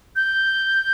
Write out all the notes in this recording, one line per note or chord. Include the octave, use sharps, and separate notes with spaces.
G6